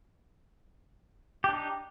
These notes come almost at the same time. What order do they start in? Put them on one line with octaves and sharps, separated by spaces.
G4 D4 D#4